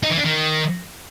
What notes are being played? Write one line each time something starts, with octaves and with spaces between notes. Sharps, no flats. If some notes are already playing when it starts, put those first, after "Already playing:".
D#4
E3
D4
D#3